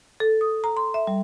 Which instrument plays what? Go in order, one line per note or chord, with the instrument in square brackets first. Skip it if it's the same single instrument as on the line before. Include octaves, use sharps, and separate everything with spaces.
[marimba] A4
D#6
A#5
C6
E5
G3